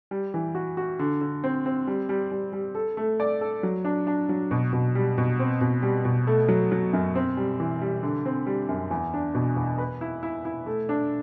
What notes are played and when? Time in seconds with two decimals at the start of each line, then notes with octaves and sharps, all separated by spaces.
0.11 G3
0.34 E3
0.55 F#4
0.77 F#4
0.99 D3
1.21 D3
1.44 C4
1.66 C4
1.87 G3
2.09 G3
2.32 G3
2.53 G3
2.75 A4
2.97 A3
3.20 D5
3.41 A4
3.63 F#3
3.85 D4
4.07 D4
4.29 F#3
4.51 B2
4.73 B2
4.95 G3
5.18 B2
5.40 C4
5.61 B2
5.83 G3
6.05 B2
6.27 A3
6.48 F#3
6.72 F#3
6.93 F#2
7.15 C4
7.37 G3
7.60 E3
7.81 G3
8.03 D3
8.26 C4
8.47 G3
8.69 F#2
8.91 E2
9.14 D4
9.34 B2
9.56 E2
9.78 B4
10.01 E4
10.23 E4
10.45 E4
10.66 A3
10.89 D4